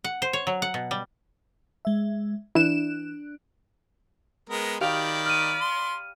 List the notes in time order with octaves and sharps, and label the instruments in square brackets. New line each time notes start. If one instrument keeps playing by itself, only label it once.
[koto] F#5
C5
C#5
F#3
F#5
B2
G3
[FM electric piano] G#3 E5
[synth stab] E3 E7 [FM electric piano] D4 F#6
[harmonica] G#3 B3 A#4
[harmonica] D#3 [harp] G4 F5 [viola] D5 B5
[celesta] F6 D#7
[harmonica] C6